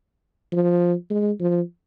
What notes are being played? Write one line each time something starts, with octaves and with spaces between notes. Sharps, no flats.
F3
G#3
F3